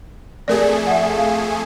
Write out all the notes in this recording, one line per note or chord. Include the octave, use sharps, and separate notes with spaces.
F2 A3 G4 G#4 A#4 D5
E5 F#5
F5